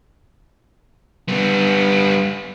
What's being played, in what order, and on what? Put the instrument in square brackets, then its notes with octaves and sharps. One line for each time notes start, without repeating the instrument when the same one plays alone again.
[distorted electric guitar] G3 B3